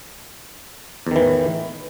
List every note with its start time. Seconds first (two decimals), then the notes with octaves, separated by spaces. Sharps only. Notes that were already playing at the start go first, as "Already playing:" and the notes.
1.07 E2
1.11 D#3
1.16 E3
1.20 A2